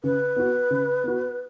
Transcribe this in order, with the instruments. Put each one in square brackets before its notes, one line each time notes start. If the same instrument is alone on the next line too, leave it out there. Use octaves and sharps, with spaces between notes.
[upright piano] C#3 [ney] B4
[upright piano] B3 F#4
C#3
B3 F#4